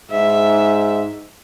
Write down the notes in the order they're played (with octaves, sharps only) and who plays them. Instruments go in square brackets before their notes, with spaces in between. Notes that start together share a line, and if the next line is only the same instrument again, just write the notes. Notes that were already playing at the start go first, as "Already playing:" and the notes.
[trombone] G#2 [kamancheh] E5